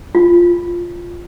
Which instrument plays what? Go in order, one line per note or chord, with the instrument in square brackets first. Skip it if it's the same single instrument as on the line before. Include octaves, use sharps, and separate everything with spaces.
[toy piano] F4